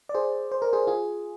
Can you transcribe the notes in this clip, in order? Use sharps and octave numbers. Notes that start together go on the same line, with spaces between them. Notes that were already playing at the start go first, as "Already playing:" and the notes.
D5
G#4 C5
C5
A#4
G#4 C5
F4 G#4